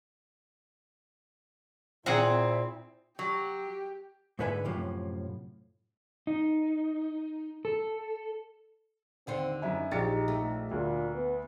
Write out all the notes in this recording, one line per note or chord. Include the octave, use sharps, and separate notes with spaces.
A#2 C4 E4 G#4 F#5 A#5
F#3 G4
G#2 D3 E4 B4 E5 G#5
F#2 A2 C3 F3
D#4
A4
D#2 D3 C4 C5
F#2 D#4 E4 G#5
A#1 D#4 G4 A6 C#7
A3
D2 A#2
B3